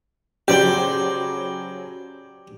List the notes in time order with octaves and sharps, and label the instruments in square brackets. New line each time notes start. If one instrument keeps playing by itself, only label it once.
[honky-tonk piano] C#3 F#3 C5 [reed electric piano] G4 [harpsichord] D5 G5